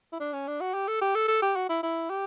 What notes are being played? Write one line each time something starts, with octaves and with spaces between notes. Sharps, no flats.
E4
D4
C#4
D4
F#4
G4
A4
G4
A4
A4
G4
F#4
E4
E4
G4